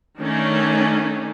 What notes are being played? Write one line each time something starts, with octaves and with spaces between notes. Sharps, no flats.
D#3 A3 C#4 D4